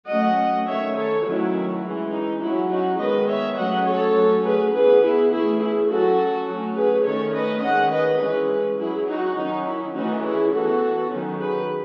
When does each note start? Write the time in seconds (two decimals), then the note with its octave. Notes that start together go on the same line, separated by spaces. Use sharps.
0.09 F#3 A3 C#4 D#5 F#5
0.67 D#3 A3 C#4 C#5 E5
0.96 A4 C#5
1.25 D#3 F#3 A3 C#4 E4
1.83 E3 G#3 C#4
2.12 D#4
2.42 F#3 C#4 E4
2.71 D#4 F#4
3.00 D#3 G#3 B3 B4 D#5
3.28 C#5 E5
3.57 F#3 A3 C#4 D#5 F#5
3.86 A4 C#5
4.16 F#3 A3 C#4
4.44 G#4 B4
4.73 E3 B3 G#4 B4
5.02 E4 G#4
5.31 E3 A3 C#4 E4 G#4
5.60 E4 G#4
5.89 F#3 C#4 F#4 A4
6.48 F#3 A3 C#4
6.76 G#4 B4
7.05 D#3 A3 C#4 A4 C#5
7.34 B4 D#5
7.63 D#3 G#3 C#4 D#5 F#5
7.92 B4 D#5
8.21 E3 G#3 C#4 G#4 B4
8.79 F#3 C#4 E4 G#4
9.08 D#4 F#4
9.37 D#3 F#3 C#4 D#4
9.67 E4
9.95 E3 A3 C#4 D#4 F#4
10.24 E4 G#4
10.53 E3 B3 F#4 A4
11.11 D#3 F#3 C#4
11.40 G#4 B4